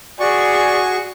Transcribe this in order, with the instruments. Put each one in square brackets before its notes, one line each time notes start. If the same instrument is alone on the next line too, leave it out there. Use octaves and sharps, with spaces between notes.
[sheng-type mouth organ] F#4 C#6 [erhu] G#4 [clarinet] D5